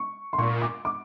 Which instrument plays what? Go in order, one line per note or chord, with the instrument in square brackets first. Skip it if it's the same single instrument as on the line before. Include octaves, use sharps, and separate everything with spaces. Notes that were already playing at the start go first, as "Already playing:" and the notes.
Already playing: [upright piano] C#6
C6
[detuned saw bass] A#2 [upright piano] C#6
[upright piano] D6
D6